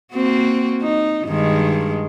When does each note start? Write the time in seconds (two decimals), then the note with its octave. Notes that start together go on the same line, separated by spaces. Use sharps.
0.13 A#3 C4 F#4
0.82 D#4
1.25 G2 D#3 G#3